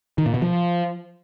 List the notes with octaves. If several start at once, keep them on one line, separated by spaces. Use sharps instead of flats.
D#3
A#2
B2
F3